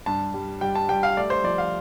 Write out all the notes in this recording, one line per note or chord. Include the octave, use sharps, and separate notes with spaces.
G2 A5
G3
G3 G5
A5
G3 G5
F5
A3 D5
C5
F3 D5
F5